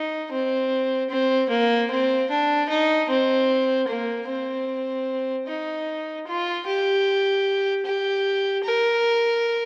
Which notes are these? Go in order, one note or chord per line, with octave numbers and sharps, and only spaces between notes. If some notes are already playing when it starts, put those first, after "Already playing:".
Already playing: D#4
C4
C4
A#3
C4
D4
D#4
C4
A#3
C4
D#4
F4
G4
G4
A#4